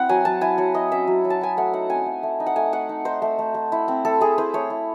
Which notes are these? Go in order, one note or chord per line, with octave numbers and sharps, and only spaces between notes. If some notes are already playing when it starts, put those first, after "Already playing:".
Already playing: C4 E4 F#5
F#3 G#5
F#3 A5
E4 G#5
F#3 F#5
E4 D#5
C#4 E5
F#3
F#3
A5
E4 G#5
A3 F#5
D#4 F#5
C4 G#5
A3
A3
D#4
F#5
A3 G#5
A3 F#5
D#4
D#4 C5
A3
A3
A3
E4
C4
A3 A4
A3 G#4
E4 C5
A3 C#5
E4